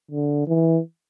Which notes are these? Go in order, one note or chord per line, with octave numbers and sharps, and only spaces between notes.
D3
E3